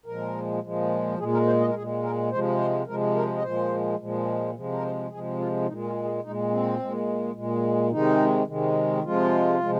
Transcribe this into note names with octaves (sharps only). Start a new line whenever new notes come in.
A#2 F3 G#3 A#4
A#2 F3 G#3
A#2 G#3 G#4
A#4
C5
D#5
A#4
A#2 G#3 G#4
A#4
C3 F3 G#3 C5
C5
C3 F3 G#3 A#4
A#4
D#5
A#2 F3 G#3 C5
A#2 F3 G#3
C3 F3 G#3
A#4
C5
C3 F3 G#3 G#4
F4
F4
A#2 G#3 D#4
F4
G#4
A#2 G#3 D#4
C4
A#2 G#3
A#2 G#3
C3 D#3 G#3 D#4
C3 D#3 G#3
C3 F3 G#3 F4
C3 F3 G#3